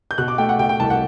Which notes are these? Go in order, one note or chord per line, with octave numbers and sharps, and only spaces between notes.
G6
B2 F#6
D6
A3 G5
F#5
B2 G5
G5
C2 A5
F#5